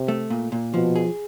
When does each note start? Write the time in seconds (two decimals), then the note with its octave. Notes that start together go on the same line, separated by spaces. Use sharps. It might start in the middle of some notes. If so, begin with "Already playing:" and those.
Already playing: C3
0.08 A3
0.30 A#2
0.52 A#2
0.74 B2 F3
0.96 G#4